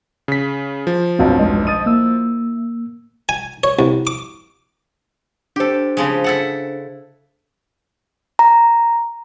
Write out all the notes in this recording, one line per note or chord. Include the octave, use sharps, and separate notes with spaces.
C#3 B6
F3
F1 B1 G2 C4 F#4 F5
E2 G#3 D#5
D#5 D#6 A6 D#7
A#3 E4 E6
G#5
C#5
C2
D6
D4 G4 A4 C5
C#3 F3 G#3
E4 A4 F#5
A#5